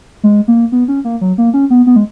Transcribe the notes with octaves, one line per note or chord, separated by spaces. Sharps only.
G#3
A#3
B3
C#4
A#3
F#3
A#3
C#4
B3
B3
G#3